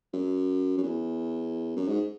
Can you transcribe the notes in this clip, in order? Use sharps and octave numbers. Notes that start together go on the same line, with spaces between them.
F#2
F#2
E2
F#2
G#2